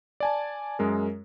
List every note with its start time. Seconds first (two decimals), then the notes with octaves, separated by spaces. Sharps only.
0.20 D5 G#5 A5
0.79 F#2 G#3 A#4